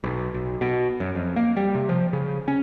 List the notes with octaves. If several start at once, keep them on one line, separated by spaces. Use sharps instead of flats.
B1
B1
B2
F#2
F2
A#3
G3
C3
F3
C#3
C#4